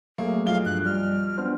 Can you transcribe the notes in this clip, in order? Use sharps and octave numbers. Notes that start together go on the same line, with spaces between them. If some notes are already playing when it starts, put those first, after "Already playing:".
F#3 A3 A#3 G#4
B1 F3 F5 G7
G2 F#6
G3 F6
B3 D4 C5